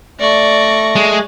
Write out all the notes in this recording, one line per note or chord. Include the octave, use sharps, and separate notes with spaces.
A3 D5 C#6 A#6
G#3